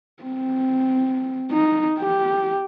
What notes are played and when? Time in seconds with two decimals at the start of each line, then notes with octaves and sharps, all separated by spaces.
0.23 C4
1.51 D#4
1.99 G4